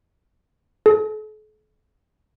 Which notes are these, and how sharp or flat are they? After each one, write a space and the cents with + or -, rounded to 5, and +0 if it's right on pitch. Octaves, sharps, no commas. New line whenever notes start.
A4 -45